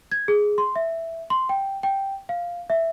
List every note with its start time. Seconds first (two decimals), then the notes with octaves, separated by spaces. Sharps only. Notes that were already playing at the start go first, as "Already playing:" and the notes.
0.12 G#6
0.28 G#4
0.58 C6
0.76 E5
1.30 C6
1.49 G5
1.83 G5
2.29 F5
2.70 E5